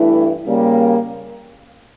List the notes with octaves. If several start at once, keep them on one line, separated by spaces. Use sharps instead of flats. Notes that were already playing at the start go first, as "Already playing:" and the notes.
Already playing: G2 E3 A3 E4
C#3 G3 A#3